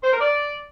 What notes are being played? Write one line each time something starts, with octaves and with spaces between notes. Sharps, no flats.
C5
A#4
D5